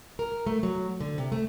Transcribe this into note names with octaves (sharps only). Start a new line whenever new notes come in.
A#4
A3
F#3
D3
C3
A3